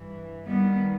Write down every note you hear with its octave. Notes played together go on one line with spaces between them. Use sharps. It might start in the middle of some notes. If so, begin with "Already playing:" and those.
Already playing: G2 E3
D#2 D#3 G3 B3